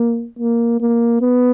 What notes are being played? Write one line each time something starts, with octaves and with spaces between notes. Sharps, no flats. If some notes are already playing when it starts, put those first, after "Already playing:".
Already playing: A#3
A#3
A#3
B3